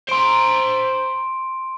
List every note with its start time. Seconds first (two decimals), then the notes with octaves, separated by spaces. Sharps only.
0.09 C5 A#5 C6 D7